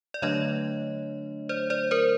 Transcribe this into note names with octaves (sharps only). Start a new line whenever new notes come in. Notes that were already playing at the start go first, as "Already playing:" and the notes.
D5
D3 F#3 A3 D4 C#5 D#5
C5 D5
C5 D5
A#4 C5